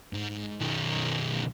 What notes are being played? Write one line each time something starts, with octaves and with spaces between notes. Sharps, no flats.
G#2
B1 D#3